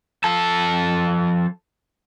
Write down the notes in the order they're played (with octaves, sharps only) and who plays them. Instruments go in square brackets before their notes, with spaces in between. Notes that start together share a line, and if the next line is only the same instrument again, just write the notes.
[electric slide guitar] F3 A4 A5